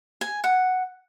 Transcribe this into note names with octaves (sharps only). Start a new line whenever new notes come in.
G#5
F#5